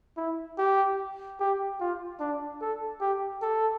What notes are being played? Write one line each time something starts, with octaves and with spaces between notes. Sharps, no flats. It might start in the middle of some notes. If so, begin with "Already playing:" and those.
E4
G4
G4
F4
D4
A4
G4
A4